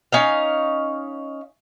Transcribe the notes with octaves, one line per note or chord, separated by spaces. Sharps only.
C#4 D#4 F5